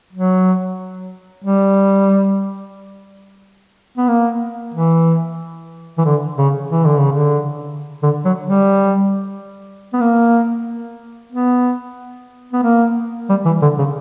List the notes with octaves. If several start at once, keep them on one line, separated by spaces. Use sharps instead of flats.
F#3
G3
B3
A#3
E3
E3
D3
C#3
E3
D3
C#3
D3
D3
F#3
G3
B3
A#3
B3
B3
A#3
G3
E3
D3
C#3